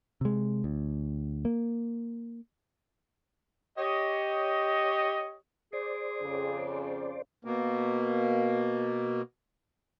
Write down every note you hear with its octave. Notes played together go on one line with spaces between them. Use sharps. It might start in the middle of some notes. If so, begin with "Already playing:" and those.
C3 G#3
D2
A#3
G4 C#5 D#5
G#4 C5 D5
F2 C#3
B2 A#3